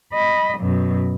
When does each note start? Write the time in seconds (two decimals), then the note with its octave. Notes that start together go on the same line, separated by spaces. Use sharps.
0.13 D#5 B5
0.59 F#2 B2